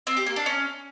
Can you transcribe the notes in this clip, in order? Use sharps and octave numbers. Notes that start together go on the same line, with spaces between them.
C4
G4
A#3
D4
C#4